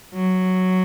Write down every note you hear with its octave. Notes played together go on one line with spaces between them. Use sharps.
F#3